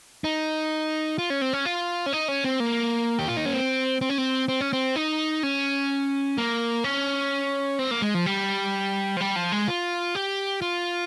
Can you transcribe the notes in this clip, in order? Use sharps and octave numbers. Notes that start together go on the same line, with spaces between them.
D#4
F4
C#4
C4
C#4
F4
C#4
D#4
C#4
C4
A#3
G4
F4
D#4
C#4
C4
C4
C#4
C4
C4
C#4
C4
D#4
C#4
A#3
C#4
C4
A#3
G#3
F3
G3
F3
G3
F3
G#3
F4
G4
F4